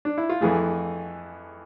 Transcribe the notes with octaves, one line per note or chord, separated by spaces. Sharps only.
D4
E4
F4
F2 E3 A3 G#4